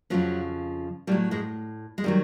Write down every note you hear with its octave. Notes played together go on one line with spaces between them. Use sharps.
F2 C#3 F3 F#3
A2 F#3 G3
G#2 G#3
G#3
D#3 F#3 G3